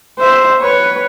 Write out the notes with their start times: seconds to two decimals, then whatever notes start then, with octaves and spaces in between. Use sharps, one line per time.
0.19 C5 E5
0.61 B4 C#5